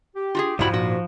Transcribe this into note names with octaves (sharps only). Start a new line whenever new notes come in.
G4
F4 F#4 G#4
C2 F2 G#2 F3 G3 E4 F#4 B5
A#2 F#4